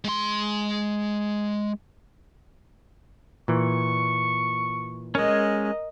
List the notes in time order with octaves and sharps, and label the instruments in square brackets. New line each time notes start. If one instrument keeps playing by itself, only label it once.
[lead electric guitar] G#3 C6
[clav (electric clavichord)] A#2 E3 [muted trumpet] C#6
[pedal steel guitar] G#3 C#4 [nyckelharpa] A#4 D#5